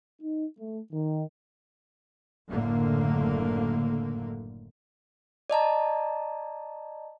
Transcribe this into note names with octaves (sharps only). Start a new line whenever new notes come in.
D#4
A3
D#3
F#1 A2 D3 A#3
D5 D#5 A5 A#5